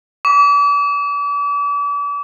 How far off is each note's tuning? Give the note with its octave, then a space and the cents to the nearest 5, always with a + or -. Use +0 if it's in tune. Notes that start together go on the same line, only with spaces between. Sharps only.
D6 -40